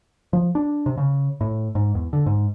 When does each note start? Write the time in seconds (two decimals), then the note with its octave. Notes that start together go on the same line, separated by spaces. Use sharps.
0.33 F3
0.55 D4
0.86 C3
0.97 C#3
1.41 A2
1.75 G#2
1.95 E2
2.13 D3
2.26 G#2